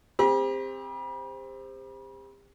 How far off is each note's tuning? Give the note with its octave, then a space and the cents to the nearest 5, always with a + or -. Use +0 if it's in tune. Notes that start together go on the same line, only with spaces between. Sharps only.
C4 +0 G4 +40 B5 -40